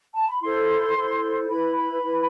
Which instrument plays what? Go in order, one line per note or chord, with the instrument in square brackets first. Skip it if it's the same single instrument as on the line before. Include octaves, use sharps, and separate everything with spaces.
[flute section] A5
B5
E4 A4 C5 C6
E4 A4 C5
E4 B4 B5
B5
E4 B4